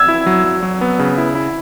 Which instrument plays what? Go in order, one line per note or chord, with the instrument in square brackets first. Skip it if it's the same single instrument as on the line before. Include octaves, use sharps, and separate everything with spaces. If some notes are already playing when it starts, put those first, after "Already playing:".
Already playing: [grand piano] E6 G#6
[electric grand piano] E4
F#3
F#3
F#3
B3
C#3
E4
E4